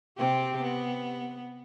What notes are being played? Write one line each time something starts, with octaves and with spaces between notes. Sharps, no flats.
C3 C4 G4
B3